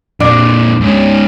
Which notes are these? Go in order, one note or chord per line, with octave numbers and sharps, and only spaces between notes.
F2 A#2 D4
G#2 C#4